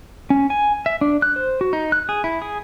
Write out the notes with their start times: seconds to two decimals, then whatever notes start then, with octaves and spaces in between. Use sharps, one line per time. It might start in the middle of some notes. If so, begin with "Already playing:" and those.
0.30 C#4
0.50 G#5
0.86 E5
1.01 D4
1.22 F#6
1.36 C5
1.61 F#4
1.73 D#4
1.92 F#6
2.09 G#4
2.24 E4
2.42 G#4